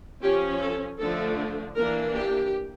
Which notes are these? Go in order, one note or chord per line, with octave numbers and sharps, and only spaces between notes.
F3 C#4 G4
A4
D3 F3 A3 D4 A4
E3 A#3 D4 A#4
G4